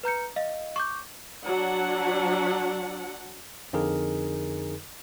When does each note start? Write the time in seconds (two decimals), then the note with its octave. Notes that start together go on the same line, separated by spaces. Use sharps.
0.03 B4 A#5 G6 C#7
0.36 D#5 F5
0.76 C#6 D6 G6
1.46 F#3 D4 F#5
3.73 F2 D3 D#4 G#4 A#4